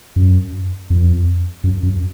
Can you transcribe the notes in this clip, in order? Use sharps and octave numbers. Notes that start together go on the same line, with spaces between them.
F#2
F2
F#2
F#2